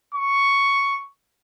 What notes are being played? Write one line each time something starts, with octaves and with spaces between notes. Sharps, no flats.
C#6